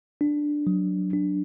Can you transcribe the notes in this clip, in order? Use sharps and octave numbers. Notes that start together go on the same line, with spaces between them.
D4
F#3
D4